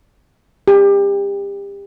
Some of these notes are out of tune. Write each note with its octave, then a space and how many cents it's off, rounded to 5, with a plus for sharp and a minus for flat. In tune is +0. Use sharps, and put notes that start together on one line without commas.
G4 +30